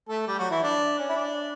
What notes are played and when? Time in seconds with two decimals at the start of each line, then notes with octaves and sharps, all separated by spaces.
0.09 A3 A4
0.27 G3 G4
0.39 F#3 F#4
0.50 E3 E4
0.62 D4
0.99 C#4
1.09 E4
1.16 D4